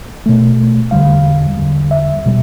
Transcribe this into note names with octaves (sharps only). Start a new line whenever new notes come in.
B2 A3
E2 D3 G3 F5
E2 D3 G3
E5
B2 G3